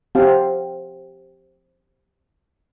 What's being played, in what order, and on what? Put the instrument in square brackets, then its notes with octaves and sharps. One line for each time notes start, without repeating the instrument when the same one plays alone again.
[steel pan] C4 G4 F5 F#5 A5